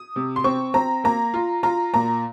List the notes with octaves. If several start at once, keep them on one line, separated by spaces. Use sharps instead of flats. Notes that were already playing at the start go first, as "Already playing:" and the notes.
Already playing: D#6
C3
C6
C4 C#6
C4 A#5
A#3 A#5
F4
F4 A#5
A#2 A#5